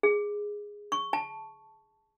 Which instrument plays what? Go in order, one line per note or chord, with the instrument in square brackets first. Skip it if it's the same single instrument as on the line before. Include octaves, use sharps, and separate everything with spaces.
[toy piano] G#4
C#6
A5